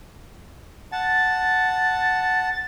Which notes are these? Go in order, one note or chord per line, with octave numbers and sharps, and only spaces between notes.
F#5 A5 A6